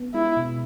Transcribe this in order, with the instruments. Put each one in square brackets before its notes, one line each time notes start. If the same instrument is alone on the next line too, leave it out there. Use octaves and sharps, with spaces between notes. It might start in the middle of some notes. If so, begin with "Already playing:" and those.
Already playing: [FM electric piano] B3
[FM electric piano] G#3 [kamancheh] E4
[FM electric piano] B2